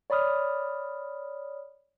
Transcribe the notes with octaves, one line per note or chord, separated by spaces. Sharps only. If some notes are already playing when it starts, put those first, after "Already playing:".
C#5 D5 B5 D#6 F6